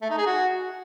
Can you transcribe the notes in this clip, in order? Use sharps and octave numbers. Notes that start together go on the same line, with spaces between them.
A3
D#4
G#4
F#4